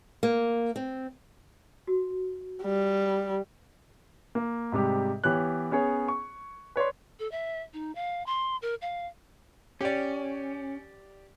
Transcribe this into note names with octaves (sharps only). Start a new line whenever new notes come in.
A#3
C4
F#4
G3
A#3
G#2 C3 G3 G4
E3 B3 G4 C#5 F#6
B3 C#4 G#4 C#5
C#6
B4 C#5 D5 C6
A4
E5
D#4
F5
C6
A#4
F5
C#4 G4 D5